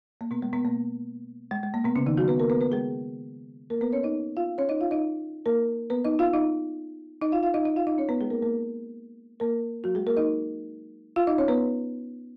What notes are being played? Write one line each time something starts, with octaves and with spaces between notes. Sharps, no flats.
A#3
B2 B3
G#3
B2 B3
A#3
G#3
G#3
A#3
B2 B3
C#3 C#4
D#3 D#4
F#3 F#4
B3 B4
A#3 A#4
B3 B4
B3 B4
G#3 G#4
A#3 A#4
B3 B4
C#4 C#5
D#4 D#5
F4 F5
C#4 C#5
D#4 D#5
F4 F5
D#4 D#5
A#3 A#4
B3 B4
D#4 D#5
F4 F5
D#4 D#5
D#4 D#5
F4 F5
F4 F5
D#4 D#5
D#4 D#5
F4 F5
D#4 D#5
C#4 C#5
B3 B4
G#3 G#4
A#3 A#4
A#3 A#4
A#3 A#4
F#3 F#4
G#3 G#4
A#3 A#4
D#4 D#5
F4 F5
D#4 D#5
C#4 C#5
B3 B4